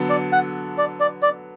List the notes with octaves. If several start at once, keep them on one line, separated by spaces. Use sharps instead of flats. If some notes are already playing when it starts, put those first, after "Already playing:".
Already playing: D3 F#3 B3 A4
D5
F#5
D5
D5
D5